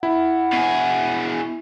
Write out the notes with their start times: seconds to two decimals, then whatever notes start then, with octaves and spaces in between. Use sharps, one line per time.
0.03 E4 F#5
0.53 B2 G#4